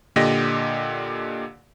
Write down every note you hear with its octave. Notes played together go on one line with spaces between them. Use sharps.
A#2 D3 G4 D#5 A#6